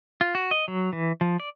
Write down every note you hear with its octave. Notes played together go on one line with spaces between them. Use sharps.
F4
F#4
D#5
F#3
E3
F3
D5